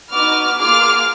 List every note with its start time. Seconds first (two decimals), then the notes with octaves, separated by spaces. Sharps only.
0.11 B3 D#4 F#4 D6 F6
0.57 A#3 F4 G#4 D6 F6